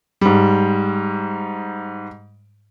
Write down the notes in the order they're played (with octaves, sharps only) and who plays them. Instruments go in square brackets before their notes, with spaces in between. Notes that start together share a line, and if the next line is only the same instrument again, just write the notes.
[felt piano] G#2 G3